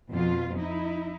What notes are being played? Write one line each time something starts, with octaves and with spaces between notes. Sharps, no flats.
F2 B2 F4
D#4 E4